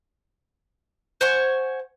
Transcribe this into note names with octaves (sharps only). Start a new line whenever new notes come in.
C5 F#5 G#5 C#6